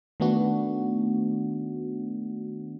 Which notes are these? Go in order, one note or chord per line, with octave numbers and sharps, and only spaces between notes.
D#3 A3 B3 D4 F#4